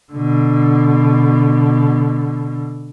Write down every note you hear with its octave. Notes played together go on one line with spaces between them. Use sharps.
B2 D3